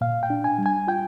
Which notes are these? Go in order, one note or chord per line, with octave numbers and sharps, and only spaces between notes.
A#2 F5
G5
D4
G#5
G3
G#5
F4 G5